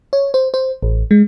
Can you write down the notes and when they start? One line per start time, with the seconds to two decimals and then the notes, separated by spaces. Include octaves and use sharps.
0.13 C#5
0.34 C5
0.54 C5
0.83 A1
1.11 G#3